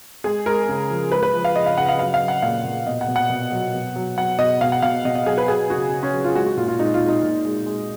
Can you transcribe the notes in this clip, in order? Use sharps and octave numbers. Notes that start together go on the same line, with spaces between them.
G#3 G#4
G#3 A#4
C#3
F3
G#3 B4
B4
F3
F5
C#3 D#5
F5
C#3 F#5
F5
F#3 F5
F5
F#3
F#5
A#2 F5
A#2
B2 D#5
F#5
B2
F#5
B2
F#3
B2
F#3
F#3 F#5
B2 D#5
B2 F5
F#5
B2 F5
B2 D#5
D#5
F#3 G#4
B4
F#3 G#4
C#3 F#4
C#3
C#4
F#3
F4
G#3 F#4
F#4
A#2 F4
F4
G#3 D#4
F4
G#3
D#4
A#2
G#3
G#3